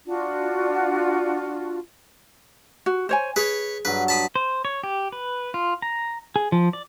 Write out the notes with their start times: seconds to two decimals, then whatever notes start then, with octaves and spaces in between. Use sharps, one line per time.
0.06 D4 F4 F#4
2.86 F#4
3.09 C5 C#5 G#5
3.36 G#4 B4 C#5
3.85 G2 F#3 B4
4.08 A5 B5 D#6
4.36 C5
4.65 C#5
4.84 G4
5.12 B4
5.54 F4
5.82 A#5
6.36 G#4
6.52 F3
6.73 D5